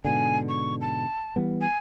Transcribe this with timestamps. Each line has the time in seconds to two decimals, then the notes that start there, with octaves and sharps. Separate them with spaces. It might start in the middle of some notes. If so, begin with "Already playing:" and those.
0.05 G#2 B2 D3 G#5
0.49 C#6
0.81 A5
1.36 E3 G3 B3
1.61 G#5